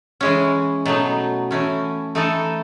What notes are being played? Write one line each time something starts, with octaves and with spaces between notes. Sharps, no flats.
E3 G#3 C#4
B2 F#3 A3 D#4
E3 A3 C#4
E3 A3 D#4 A4